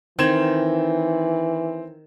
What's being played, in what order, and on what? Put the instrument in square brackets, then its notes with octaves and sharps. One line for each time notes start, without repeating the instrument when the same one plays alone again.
[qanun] D#3 [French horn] E3 [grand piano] C4 G#6 E7